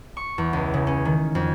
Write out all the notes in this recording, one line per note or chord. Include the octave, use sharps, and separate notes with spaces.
C#6
E2
C#2
C#3
C#4
D#3
F2